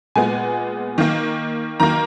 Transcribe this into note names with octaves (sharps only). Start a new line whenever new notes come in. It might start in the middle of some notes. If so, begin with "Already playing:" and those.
A#2 G#3 B3 G#5
D#3 A#3
D#3 A#3 A#5